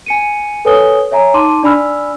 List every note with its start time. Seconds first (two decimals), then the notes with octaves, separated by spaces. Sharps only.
0.06 G#5 C#7 D#7
0.65 A4 B4 C#5 G#5 D#6 G7
1.11 C#5 E5 G#5 A#5
1.34 D#4 A5 C6 D6 D#7
1.63 D4 D5 G#5 B5 E6 F6